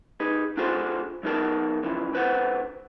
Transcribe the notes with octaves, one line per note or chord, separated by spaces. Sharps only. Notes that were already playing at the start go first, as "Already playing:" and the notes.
D#4 G#4 B4
D4 F4 F#4 G#4 A4 C5
F#3 B3 D#4 G#4 A#4 A5
F#2 C#3 E3 F3
C#2 D3 B4 C5 F#5